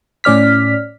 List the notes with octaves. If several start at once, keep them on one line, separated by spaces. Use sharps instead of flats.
A2 C#4 D5 F6 B6